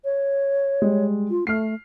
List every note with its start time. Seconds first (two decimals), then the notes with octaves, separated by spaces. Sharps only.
0.05 C#5
0.82 G3 G#3
1.30 F4
1.47 A3 F6 C7